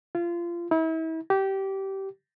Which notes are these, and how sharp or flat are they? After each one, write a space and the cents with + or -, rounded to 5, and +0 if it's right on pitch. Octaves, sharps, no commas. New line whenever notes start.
F4 -25
E4 -35
G4 -20